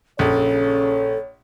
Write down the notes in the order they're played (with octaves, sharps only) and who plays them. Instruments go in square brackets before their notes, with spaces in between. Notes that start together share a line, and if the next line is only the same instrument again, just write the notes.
[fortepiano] A#1 [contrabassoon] C#3 [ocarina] A4 [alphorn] C#5